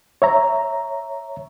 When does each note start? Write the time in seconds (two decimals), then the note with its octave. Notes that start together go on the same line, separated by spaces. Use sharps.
0.22 C#5 E5 A#5